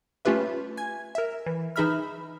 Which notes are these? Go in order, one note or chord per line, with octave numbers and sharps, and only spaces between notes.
A3 C#4 F4 G4 B4 E5
G#5 G#6
A#4 E5
E3
E3 D#4 G#4 E5 B5 F6